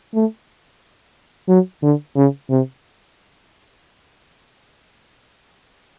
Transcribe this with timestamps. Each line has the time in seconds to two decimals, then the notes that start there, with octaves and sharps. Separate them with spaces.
0.14 A3
1.48 F#3
1.83 D3
2.16 C#3
2.50 C3